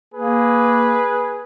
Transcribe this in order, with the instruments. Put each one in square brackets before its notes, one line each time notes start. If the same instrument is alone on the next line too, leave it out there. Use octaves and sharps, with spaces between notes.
[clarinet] A#3 [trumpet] G#4 [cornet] B4